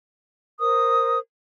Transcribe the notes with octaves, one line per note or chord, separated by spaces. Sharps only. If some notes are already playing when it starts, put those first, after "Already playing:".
A#4 C5 D#6